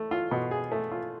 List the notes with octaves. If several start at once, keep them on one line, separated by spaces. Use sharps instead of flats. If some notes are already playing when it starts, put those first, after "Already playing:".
Already playing: A3
F4
B2
G#4
A3
F4